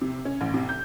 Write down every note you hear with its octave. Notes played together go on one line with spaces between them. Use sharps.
C3
C#4
A1
C3
G6